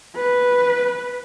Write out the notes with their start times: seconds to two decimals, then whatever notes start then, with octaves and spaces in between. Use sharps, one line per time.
0.16 B4